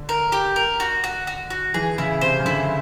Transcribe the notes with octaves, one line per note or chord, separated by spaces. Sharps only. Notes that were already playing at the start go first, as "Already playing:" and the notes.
Already playing: D3
A#4
G4
A#4
F#4
F#4
F#4
F#4
E3 G#4
C#3 E4
C3 C5
C#3
D3 E4